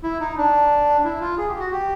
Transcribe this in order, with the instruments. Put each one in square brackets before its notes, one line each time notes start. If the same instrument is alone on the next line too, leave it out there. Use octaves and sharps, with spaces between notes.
[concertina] E4
D#4
D4
E4
F4
G#4
G4
F#4
G4